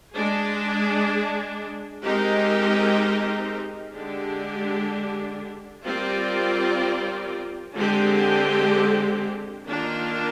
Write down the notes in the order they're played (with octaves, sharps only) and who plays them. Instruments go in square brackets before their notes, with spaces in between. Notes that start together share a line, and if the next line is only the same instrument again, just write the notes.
[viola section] G#3 D4 G#4
G#3 C4 D#4 G4 A#4
D3 G#3 D4 G4
G3 C4 F4 A#4 D5
D3 G#3 C4 G4
D#3 A#3 D4 F4 A#4